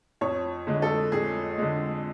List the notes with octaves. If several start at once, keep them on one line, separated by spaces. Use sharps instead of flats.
F2 C#5
D3 G#3
A4
F2 G#4
D3 G#3